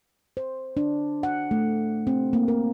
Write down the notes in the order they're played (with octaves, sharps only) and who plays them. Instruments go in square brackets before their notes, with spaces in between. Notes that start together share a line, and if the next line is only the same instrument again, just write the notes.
[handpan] C5
D4
F#5
A3
C4
A#3
A#4